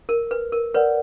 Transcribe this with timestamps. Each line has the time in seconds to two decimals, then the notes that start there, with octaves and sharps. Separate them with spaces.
0.09 A#4
0.31 B4
0.52 A#4
0.74 A#4 B4 C#5 D5 F#5